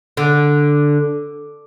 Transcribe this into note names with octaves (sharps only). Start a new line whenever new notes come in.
D3